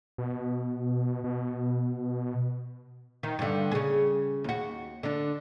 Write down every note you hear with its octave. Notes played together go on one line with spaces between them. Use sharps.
B2
B2
D#3
G2 D3
C#3 G#4
D#2 F#4
D3 D4